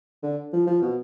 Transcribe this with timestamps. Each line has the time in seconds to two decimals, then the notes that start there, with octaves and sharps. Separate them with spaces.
0.23 D3
0.53 F3
0.67 F3
0.82 B2